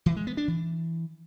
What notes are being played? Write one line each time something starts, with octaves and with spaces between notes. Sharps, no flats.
E3
G#3
B3
D4
E3